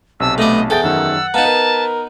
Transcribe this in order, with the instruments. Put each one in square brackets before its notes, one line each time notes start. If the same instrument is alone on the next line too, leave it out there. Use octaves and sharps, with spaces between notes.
[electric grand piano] B1 C3 A5 [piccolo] E6
[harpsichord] A3 D5 [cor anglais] B3 [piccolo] D#5
[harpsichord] E2 A4 [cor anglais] G#4 [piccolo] G5 [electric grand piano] G#5 A6
[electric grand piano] F#2 D#3 F#3 [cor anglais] F#5 [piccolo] E6
[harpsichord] B3 D#4 [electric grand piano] B4 F5 A#5 [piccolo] A5
[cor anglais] A#4 [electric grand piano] B4